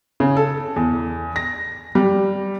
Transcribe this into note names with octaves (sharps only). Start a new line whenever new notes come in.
C#3
A4
E2
A#6
G3